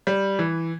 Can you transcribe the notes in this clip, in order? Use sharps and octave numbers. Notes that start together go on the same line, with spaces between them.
G3
E3